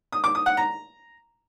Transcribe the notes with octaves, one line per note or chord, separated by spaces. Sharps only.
D#6
D6
D#6
F#5
A#5